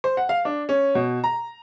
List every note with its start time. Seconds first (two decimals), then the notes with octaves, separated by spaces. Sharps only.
0.04 C5
0.17 F#5
0.29 F5
0.45 D4
0.69 C#4
0.95 B2
1.24 A#5